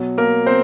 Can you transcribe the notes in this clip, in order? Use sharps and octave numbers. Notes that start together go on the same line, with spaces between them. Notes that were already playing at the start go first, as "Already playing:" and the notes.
Already playing: B2 F#3
A#3 A#4
C4 C5